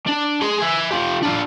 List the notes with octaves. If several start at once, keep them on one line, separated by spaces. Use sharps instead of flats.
D4
G#4 C6
E5 G#5
F4 G4
D4 F4